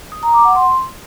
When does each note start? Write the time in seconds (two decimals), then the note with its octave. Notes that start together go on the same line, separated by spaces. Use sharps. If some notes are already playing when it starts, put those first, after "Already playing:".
0.12 D#6
0.23 A#5
0.34 D6
0.44 F#5
0.55 C6